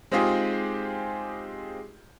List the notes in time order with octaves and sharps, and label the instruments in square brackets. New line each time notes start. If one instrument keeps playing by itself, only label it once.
[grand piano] G#3 C4 D#4 F4 G4 G#4